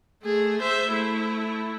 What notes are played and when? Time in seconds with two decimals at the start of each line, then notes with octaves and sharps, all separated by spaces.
0.24 A3 G#4
0.62 C5 E5
0.92 A3 E4